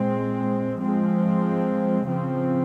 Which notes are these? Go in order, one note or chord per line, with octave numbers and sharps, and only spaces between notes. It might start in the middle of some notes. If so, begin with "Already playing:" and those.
Already playing: A#2 G#3 C4
F3 G#3 C4
C#3 F3 C4